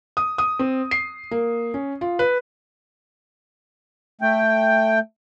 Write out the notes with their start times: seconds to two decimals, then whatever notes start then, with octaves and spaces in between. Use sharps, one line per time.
0.17 D#6
0.38 D#6
0.59 C4
0.91 C7
1.31 A#3
1.74 C#4
2.01 F4
2.19 B4
4.21 A3 G5